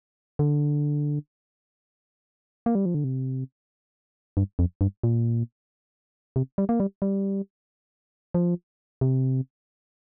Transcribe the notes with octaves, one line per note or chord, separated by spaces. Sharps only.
D3
A#3
G3
F3
D3
C3
G2
F2
G2
A#2
C3
G3
A#3
G3
G3
F3
C3